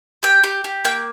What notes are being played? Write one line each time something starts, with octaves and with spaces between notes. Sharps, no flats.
G4 G5
G4
G4
A#3 G5